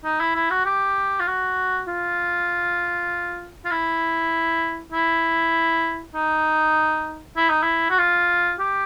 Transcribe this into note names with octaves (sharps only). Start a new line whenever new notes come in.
D#4
E4
E4
F#4
G4
F4
F#4
F4
F4
E4
E4
D#4
E4
D#4
E4
F#4
F4
G4